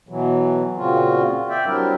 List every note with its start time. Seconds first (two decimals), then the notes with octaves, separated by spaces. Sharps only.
0.09 B2 E3 F#3
0.77 A#2 C#3 C4 F4 F#4
1.50 D5 E5 G5
1.66 F#3 G3 C4 D4 E4 A#4